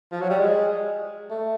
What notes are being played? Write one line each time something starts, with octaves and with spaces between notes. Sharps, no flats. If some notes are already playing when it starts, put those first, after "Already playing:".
F3
F#3
G3
G#3
A3